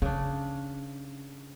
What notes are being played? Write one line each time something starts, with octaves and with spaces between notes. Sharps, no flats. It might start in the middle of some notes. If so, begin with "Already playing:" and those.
C#3 C#4 D4